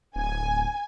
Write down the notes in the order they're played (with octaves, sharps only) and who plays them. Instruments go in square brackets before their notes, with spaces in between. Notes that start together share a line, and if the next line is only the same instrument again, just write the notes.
[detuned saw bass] D1 [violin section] G#5